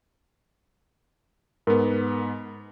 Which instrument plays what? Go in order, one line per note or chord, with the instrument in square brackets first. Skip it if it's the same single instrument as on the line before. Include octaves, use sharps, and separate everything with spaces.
[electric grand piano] G#2 B3 [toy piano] A#4